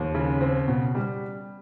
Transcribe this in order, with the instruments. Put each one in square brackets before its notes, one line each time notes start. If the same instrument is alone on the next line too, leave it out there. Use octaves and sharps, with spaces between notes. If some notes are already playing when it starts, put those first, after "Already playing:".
Already playing: [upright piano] D#2 F3
C#3
C4
B2
G3